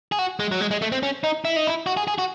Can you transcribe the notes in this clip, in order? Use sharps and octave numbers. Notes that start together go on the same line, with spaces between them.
G#4
F#4
G#3
F#3
G#3
G#3
A3
C4
C#4
D#4
E4
D#4
E4
F#4
G#4
G#4
F#4